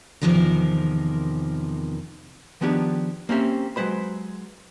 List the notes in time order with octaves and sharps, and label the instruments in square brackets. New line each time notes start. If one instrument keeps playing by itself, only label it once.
[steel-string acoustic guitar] E2 G2 C3 D#3 F3 A#4
[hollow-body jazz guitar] D#3 F3 B3 D4 G4 G#4
A#3 C4 C#4 G4 E5
F#3 G#3 B4 C5 B5